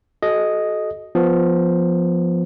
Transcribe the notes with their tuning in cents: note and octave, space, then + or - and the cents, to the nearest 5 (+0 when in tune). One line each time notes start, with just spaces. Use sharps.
F#4 +20 A4 -30 D#5 +0
F3 +0 B3 +0